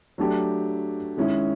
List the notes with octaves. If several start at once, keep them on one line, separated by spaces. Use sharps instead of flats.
F#3 A3 D4 G4
D#3 G#3 C#4 E4